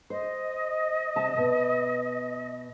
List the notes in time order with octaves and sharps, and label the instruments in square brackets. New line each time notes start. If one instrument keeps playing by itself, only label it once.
[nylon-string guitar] C5 [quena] D#5
[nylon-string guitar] C3 A5
B2